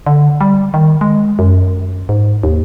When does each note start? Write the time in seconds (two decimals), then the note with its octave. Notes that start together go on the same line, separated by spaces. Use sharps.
0.07 D3
0.41 G3
0.74 D#3
1.01 G#3
1.39 F#2
2.09 G#2
2.43 D#2